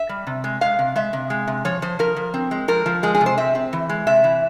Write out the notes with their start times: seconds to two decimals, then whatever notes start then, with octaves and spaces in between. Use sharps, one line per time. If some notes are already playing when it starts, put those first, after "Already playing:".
Already playing: E5
0.09 G3
0.27 C3
0.44 G#3
0.61 G#3 F5
0.79 C3
0.96 G#3 E5
1.13 C3
1.30 G#3
1.47 C3
1.65 F3 C#5
1.82 F3 C5
1.99 F3 A#4
2.16 F3
2.34 C4
2.51 G#3
2.68 F3 A#4
2.86 F3
3.03 G#3 G#4
3.15 G#4
3.21 C3
3.26 C5
3.38 C4 E5
3.55 C4
3.73 E3
3.89 G#3
4.07 C3 E5
4.24 E3